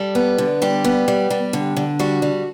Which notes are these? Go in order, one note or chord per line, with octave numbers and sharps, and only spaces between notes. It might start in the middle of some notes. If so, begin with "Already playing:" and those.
Already playing: G3 A4
B3
D3
G3 G4
B3
G3
G3
D3
D3
G3 F#4
G3